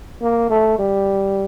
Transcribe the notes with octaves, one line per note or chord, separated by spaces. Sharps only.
A#3
A3
G3